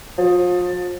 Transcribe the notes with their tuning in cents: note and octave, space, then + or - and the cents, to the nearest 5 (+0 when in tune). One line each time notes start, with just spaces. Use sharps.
F3 +35